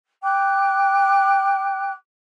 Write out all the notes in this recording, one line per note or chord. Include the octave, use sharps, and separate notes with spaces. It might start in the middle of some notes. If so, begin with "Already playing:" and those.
G5 D6 F#6